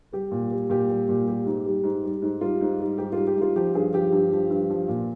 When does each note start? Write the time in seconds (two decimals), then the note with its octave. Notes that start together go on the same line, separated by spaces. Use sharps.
0.13 G3 G4
0.32 A#2
0.51 G3
0.70 A#2 G4
0.89 G3
1.09 A#2
1.27 G3 G4
1.46 G#2
1.66 G3
1.84 G#2
2.04 G3
2.22 G#2
2.41 G3 F4
2.61 G#2
2.80 G3
2.98 G#2 G4
3.12 G3 F4
3.27 G4
3.36 G#2
3.42 F4
3.56 F3 G4
3.75 G2 G#4
3.94 F3 G4
4.13 G2
4.32 F3
4.50 G2
4.70 F3
4.88 A#2